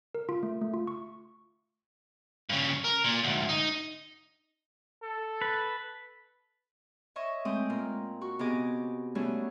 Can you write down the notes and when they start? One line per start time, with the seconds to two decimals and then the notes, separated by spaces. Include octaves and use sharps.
0.15 A#4
0.29 F4
0.43 A3
0.61 A3
0.74 F4
0.87 C#6
2.49 G2 C#3
2.84 A#4
3.04 A#2
3.24 D2 G#2
3.49 D#4
5.03 A4
5.41 B4
7.16 C#5 D#5 E5 C#6
7.45 G#3 A3 C4 G5 D#6
7.69 A#2 F4
8.21 F#4 C#6
8.39 C3 B3 G#4 D#5 D6
9.15 F#3 G3 A3 B3 C#4 G#4